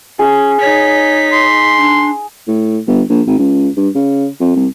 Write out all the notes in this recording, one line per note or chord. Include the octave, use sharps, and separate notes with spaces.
C#4 G#4
D#4 C#5 B6
C6
D4
A2
G1
A#1
G#1
C#2
G2
C#3
F2
C2